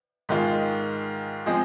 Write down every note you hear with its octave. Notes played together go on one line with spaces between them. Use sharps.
G#2 D#3 G#3 F4
F3 G#3 C4 G#4 D#5